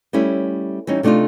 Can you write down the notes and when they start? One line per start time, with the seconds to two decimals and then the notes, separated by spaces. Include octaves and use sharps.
0.13 G3 A3 C#4 E4
0.87 E3 G3 C#4 D#4
1.03 C3 A3 D4 D#4 F4